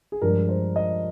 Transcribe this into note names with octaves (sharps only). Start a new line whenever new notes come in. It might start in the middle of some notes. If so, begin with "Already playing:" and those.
G#4
G2 F3 G#3 A#4
C5
D#5